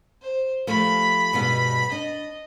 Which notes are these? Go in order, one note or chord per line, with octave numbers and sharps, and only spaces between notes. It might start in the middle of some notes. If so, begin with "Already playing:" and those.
C5
F3 G3 A3 B5
G2 B2 G#3
D4 D#5